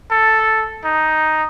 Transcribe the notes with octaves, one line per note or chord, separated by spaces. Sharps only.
A4
D#4